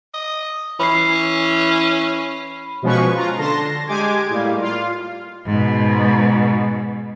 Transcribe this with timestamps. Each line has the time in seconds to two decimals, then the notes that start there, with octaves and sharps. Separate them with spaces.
0.14 D#5
0.80 E3 C#4 B5 C7
2.82 B2 F3 G#3 C#4 B4 C#6
3.15 F4 A#5
3.38 D3 A5 C6 A#6
3.87 G#3 G4 G#5 D6 G#6
4.30 A2 G3 A#3
4.60 F4 F5
5.47 G#2 B2